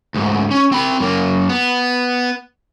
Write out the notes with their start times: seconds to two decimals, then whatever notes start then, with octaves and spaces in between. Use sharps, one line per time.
0.14 D2 G#2
0.51 C#4
0.72 C4 B5
1.00 F#2 A#3
1.49 B3